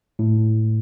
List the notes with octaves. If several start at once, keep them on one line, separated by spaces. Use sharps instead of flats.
A2